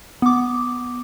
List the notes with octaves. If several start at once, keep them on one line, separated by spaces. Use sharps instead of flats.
B3 D6